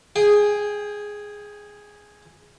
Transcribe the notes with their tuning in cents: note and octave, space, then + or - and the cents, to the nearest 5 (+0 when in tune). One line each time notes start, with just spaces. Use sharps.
G#4 +0 G5 +30